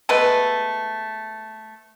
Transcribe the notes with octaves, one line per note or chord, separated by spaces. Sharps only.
G#3 A3 B3 B4